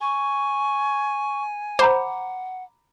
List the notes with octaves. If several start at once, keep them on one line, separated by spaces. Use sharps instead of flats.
G#5 C#6
C5 F#5 A#5 B5 D6